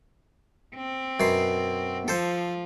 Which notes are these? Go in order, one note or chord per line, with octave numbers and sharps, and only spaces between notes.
C4
F#2 B2 C6
F3 A4 C5